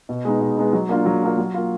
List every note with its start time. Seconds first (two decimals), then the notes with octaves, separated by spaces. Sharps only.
0.09 B2
0.25 G#3 B3 D#4
0.41 B2
0.58 G#3 B3 D#4
0.73 F#3
0.89 A#3 D4 F4
1.06 F#3
1.22 A#3 D4 F4
1.38 F#3
1.54 A#3 F4